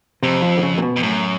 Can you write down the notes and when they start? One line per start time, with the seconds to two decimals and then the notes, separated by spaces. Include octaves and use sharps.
0.23 F2 C3
0.42 F3
0.57 D3
0.63 C#3
0.78 A#2
0.82 B2
0.96 F2
1.02 F#2 A2